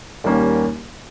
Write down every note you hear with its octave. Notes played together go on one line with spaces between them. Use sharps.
D#2 D#3 G3 A#3 C#4